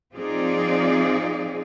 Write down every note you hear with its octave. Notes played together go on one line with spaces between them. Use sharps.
F3 C4 D#4 F4 G#4 D5